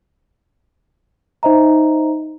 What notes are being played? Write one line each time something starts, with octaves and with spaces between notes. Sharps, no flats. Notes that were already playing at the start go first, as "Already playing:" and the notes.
D#4 C5 D#5 E5 A#5